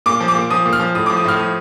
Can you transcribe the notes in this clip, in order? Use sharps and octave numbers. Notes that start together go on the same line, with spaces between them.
A#2 D6
F3
D6
A#2
F3 D#6
A#2
F6
F3
A2 D#6
D6
F3
D#6
A2 F6
F3 D#6